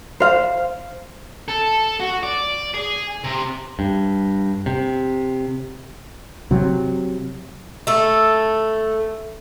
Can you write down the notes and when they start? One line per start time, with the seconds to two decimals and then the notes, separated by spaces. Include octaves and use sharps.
0.20 C5 F5
1.48 A4
2.00 F#4
2.23 D5
2.74 G#4
3.24 C3
3.79 G2
4.66 C3
6.51 C3 F#3
7.87 A3 A4